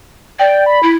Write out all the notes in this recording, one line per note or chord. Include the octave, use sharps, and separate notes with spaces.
D5 G5
B5
E4